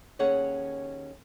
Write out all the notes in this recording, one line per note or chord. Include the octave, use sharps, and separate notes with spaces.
D#2 C#4 G#4 C#5 F#5